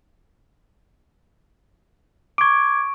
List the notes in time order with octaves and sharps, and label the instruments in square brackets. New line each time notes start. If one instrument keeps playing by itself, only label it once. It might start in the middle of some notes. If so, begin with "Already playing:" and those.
[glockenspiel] C#6 D7 [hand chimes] D6 G#6